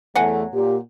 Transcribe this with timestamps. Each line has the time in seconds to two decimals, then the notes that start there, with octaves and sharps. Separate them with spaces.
0.15 E2 F#3 A3 B3 F#5 G#5
0.53 A#2 G4